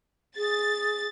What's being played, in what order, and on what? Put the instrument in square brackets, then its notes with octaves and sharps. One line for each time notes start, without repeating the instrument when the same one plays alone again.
[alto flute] G#4 [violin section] A6